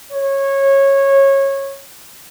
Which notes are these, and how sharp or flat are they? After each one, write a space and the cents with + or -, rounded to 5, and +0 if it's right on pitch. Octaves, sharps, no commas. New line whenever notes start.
C#5 -20